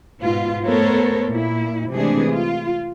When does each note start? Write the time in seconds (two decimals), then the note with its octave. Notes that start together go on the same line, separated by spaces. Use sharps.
0.23 G#2 B2 F4
0.65 A3 B3 A4 A#4 C5 C#5
1.30 A#2 E4
1.92 C3 E3 G#3 A3 D4 G#4
2.29 F4